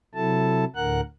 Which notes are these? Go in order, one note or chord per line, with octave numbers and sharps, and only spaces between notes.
C3 F#3 E4 A4 A5
D2 A2 D3 A#4 F#5 F#6